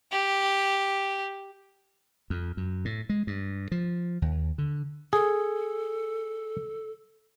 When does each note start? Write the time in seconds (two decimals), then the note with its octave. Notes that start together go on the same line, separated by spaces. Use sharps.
0.12 G4
2.30 F2
2.57 F#2
2.85 A2
3.09 G#3
3.27 G2
3.72 F3
4.22 D#2
4.58 D3
5.13 G#4 A4